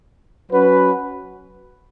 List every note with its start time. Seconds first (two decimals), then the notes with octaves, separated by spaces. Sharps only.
0.51 F#3 C#4 F#4 B4